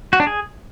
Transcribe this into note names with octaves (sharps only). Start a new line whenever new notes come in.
F#4
D4
G#4